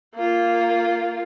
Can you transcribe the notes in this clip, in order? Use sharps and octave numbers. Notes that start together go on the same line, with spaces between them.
A#3 F4